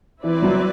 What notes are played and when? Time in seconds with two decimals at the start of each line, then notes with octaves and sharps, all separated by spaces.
0.23 E3 C4 E4 B4 D5
0.42 F#3